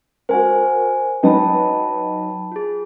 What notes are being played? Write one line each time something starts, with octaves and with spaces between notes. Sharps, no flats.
F#4 A#4 C5 G#5
F#3 D#4 B4 G5 A5 B5
F4 G#4